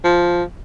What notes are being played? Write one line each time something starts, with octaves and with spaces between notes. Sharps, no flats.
F3